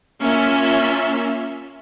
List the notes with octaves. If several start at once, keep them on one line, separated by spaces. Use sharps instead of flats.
A#3 C#4 F4 E5